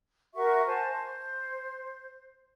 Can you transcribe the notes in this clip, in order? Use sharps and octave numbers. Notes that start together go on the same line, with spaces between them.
F#4 A#4 E5 C#6
C5 G#5 A5
C5